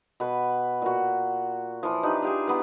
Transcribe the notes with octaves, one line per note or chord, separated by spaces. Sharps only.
B2 B4 B5
A#2 F#4
E3 F3
D4 D#4 G4 B4
F4 G4 G#4
B3 E4 B4